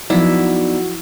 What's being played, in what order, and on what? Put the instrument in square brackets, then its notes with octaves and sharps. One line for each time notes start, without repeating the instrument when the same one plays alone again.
[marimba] F3 F#3 [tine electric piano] B3 D#4 D5 [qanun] E4 [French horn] F#4